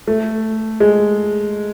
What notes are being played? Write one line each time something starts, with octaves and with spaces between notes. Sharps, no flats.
A3
G#3